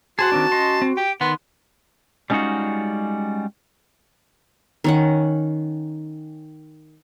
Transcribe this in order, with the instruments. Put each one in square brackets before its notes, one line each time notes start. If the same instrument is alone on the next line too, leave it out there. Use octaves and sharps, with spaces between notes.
[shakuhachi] F#4 [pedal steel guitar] G#4 C5 F#5 [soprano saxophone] A5
[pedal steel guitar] D#3 C4 D4
C#4 D#5 C6
C4
[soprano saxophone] G4 [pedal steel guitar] G5
[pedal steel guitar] D#3 F#5 C6 [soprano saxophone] B3
[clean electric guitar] G3 G#3 C#4 D#4 F4 F#4
[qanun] D#3 C#4 F#5